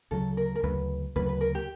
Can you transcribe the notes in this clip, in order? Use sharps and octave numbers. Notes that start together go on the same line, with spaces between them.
D2 C#3 F#3 A4
A#4
A#4
D2 C#3 F#3 B4
D2 C#3 F#3 B4
B4
A#4
G4